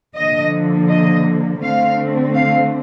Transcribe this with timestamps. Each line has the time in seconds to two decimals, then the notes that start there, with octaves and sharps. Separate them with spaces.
0.15 D3 F3 A#3 D#5
0.89 D#5
1.62 D3 A3 C4 F5
2.35 F5